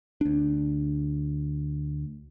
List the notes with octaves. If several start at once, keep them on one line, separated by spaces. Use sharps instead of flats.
D2 D4